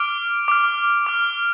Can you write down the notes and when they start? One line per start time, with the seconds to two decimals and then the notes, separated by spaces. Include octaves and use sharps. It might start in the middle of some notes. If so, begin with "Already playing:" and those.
Already playing: D6 F6 D7
0.48 D6 F6
1.07 D6 F6